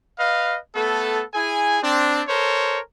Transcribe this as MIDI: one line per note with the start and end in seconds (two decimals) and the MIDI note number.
0.19 0.58 71
0.19 0.58 75
0.19 0.58 77
0.75 1.22 57
0.75 1.22 59
0.75 1.22 69
1.34 1.78 64
1.34 1.78 68
1.34 1.78 80
1.82 2.21 60
1.82 2.21 62
2.27 2.79 69
2.27 2.79 70
2.27 2.79 72
2.27 2.79 73